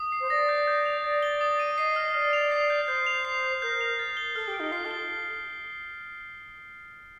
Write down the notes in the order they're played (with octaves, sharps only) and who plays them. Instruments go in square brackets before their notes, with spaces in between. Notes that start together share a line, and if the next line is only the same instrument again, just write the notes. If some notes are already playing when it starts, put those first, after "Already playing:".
Already playing: [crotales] D#6
C7
[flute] C5
[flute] D5 [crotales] A#6
[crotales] G6
G6
F7
[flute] D5 [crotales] A6
[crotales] G7
D#6
D#7
[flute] D#5 [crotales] C7
[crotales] F6
[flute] D5 [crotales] F6
[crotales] F7
C7
G6
[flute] C5 [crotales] G6
[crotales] F7
C7
G6
[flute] A#4 [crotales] G6
[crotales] F7
A6
G7
[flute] A4 [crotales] F6
[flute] G4
[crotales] D7
[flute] D#4
[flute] F4 [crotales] C7
[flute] A4
[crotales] G7